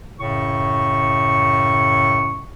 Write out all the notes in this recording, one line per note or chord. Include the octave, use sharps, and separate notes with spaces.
F#2 A2 C#3 C#6